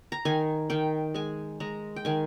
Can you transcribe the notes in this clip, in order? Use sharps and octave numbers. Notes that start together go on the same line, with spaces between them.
A#5
D#3 G#5
D#3 G5
G#3 G#5
G#3 A#5
G5
D#3 G#5